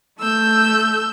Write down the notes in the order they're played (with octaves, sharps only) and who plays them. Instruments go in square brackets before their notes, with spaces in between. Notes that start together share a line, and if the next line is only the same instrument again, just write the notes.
[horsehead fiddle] A3 [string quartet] E6 G6